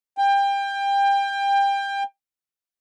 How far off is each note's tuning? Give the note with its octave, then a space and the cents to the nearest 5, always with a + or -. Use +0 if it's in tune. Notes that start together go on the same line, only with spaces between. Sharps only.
G5 +25